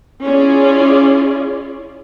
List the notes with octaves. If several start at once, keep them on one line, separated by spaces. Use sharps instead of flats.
C#4 E4 F4 G#4 D5